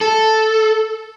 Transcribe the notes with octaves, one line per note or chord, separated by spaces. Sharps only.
A4